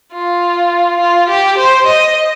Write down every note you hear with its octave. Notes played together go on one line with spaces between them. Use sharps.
F4
F4
G4
C5
D#5